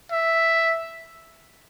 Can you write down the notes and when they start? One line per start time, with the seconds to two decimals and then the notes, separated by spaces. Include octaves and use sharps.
0.11 E5